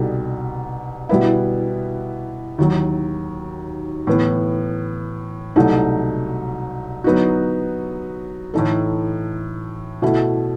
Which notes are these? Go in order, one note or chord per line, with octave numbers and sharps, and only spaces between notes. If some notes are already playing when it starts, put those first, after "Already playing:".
Already playing: C2 B2 G3 D#4 A4
B2 G3 B3 E4
D#2 D#3 F#3
A2 E3 B3
C2 B2 F#3 A3 D#4
F#3 B3 D#4 F#4
A2 E3 A3 D#4 A4
B2 A3 E4